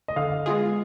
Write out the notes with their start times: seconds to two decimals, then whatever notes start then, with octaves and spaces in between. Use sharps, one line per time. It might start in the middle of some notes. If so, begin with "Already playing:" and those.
0.08 D#5
0.16 D3 F5
0.46 G#3 B3 F4 G#4